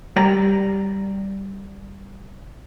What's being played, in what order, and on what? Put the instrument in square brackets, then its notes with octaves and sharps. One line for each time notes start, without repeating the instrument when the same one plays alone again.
[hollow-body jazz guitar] G3 D5 G5 A#5